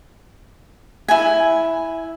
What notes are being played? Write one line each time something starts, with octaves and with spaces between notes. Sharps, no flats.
E4 G#5